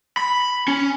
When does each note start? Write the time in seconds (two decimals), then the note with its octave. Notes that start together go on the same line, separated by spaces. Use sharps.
0.17 B5
0.68 C#4